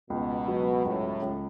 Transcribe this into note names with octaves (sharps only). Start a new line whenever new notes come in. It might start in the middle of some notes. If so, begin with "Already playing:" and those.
C#2 B2
F#3
C#2 A2
C#2